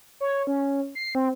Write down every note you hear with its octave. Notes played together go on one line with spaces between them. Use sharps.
C#5
C#4
C7
C4